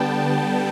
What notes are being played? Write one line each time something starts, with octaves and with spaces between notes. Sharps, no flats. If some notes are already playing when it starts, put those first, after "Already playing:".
Already playing: D3 G3 B3 G5 A5